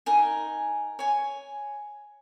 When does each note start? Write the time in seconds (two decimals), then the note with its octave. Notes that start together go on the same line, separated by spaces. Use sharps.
0.06 D#4 A#4 G#5
0.99 C#5 G#5